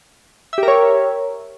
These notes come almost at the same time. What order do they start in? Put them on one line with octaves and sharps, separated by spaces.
E5 G4 A#4 C#5